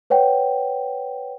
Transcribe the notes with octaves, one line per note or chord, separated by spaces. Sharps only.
B4 C#5 F#5 G5